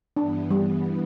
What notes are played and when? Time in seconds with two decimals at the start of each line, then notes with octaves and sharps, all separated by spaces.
0.17 G2 E3 B3 D4
0.51 G3